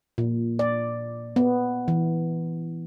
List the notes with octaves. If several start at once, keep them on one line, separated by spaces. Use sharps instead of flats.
A#2
D5
B3
E3